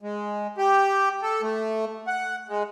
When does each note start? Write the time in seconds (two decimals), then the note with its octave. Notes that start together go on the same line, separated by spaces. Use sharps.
0.02 G#3
0.58 G4
1.22 A4
1.42 A3
2.07 F#5
2.49 G#3